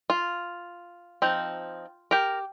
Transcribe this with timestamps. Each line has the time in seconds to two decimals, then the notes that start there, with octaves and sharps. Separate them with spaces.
0.10 F4
1.22 F3 C4 D#4
2.11 G4 A#4